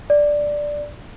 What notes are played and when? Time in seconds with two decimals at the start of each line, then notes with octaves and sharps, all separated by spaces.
0.10 D5